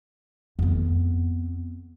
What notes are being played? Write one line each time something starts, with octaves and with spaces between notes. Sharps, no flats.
F2 B3